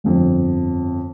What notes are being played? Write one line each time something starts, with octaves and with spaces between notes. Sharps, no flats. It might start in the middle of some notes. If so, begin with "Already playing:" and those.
G1 F2